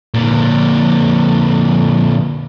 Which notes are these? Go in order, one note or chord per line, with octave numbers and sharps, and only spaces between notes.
A#2 D3